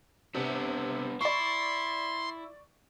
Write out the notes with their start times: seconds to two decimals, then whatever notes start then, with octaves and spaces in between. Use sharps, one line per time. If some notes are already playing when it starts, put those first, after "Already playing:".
0.35 C3 B3 D4
1.21 E4 D5 C6 C#6